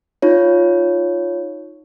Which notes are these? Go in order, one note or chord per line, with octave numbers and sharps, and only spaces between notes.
D#4 F4 C#5